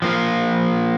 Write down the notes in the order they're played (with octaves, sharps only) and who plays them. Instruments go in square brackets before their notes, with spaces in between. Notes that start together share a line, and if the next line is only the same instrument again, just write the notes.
[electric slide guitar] F3 A#3 F4